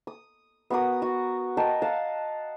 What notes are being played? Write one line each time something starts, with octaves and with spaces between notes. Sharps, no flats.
D#6
B3 F#4 A#4 D#6
F#4
A#4 D#5 G5 A5
F5 F#5 A5